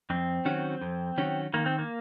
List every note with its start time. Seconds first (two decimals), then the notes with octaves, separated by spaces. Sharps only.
0.10 F2 C4
0.45 D#3 F#3 C#4 F#4
0.82 F2
1.18 D#3 F#3 C#4 F#4
1.54 D#3 A#3
1.66 C4
1.79 A#3